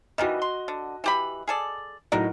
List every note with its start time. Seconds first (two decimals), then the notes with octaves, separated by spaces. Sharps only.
0.18 D#3 E3 G3 F#4 D#5
0.42 C6
0.68 D3
1.04 E3 G4 B5
1.48 G#4 A4 D5
2.12 A2 F#3 D#4 F#4 A#4